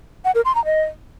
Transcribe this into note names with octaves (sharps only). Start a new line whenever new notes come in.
F#5
A#4
C6
A#5
D#5